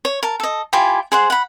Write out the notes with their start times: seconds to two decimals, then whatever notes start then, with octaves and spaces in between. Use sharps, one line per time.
0.05 C#5
0.23 A#4 A5
0.40 A4 D#5
0.73 E4 F4 G4 G#5
1.12 G#4 C5 F#5
1.30 F#5 B5